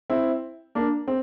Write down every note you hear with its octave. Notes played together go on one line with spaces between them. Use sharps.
C4 E4
A#3 D4
C4